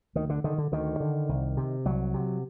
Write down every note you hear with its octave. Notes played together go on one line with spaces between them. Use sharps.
D2 D#3
D3
D3 D#3
D3
D2 D#3
D3
C2
C3
C2 F#3
C3